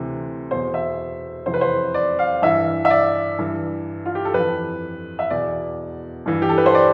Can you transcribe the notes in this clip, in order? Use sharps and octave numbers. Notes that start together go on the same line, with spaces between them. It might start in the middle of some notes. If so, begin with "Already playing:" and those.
Already playing: D2 C3 E3
E2 B2 C5
E5
F2 C3 E3 C5
B4
C5
D5
F5
G2 E3 E5
E5
D5
G2 E3
F4
G4
A4
F2 E3 B4
E5
E2 B2 D5
G2 E3
G4
A4
B4
C5
D5